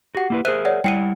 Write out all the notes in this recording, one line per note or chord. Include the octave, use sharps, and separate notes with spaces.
F#4 G4 F#5
A#3 E4 B4
G#4 A#4 C5 E5 F#6 D#7
C#5 D5 F#5
G3 E4 F#5 G5 C7 D#7